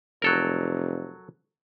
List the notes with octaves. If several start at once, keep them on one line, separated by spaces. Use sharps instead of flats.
F1 F#3 A4 A#4